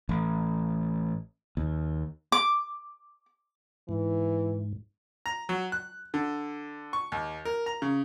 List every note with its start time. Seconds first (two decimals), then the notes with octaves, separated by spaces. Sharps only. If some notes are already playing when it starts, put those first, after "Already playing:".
0.09 A1
1.57 D#2
2.32 D6
3.89 G#2 E3
5.26 A#5
5.49 F#3
5.72 F#6
6.14 D3
6.93 C#6
7.12 D#2
7.45 A#4
7.66 A#5
7.82 C#3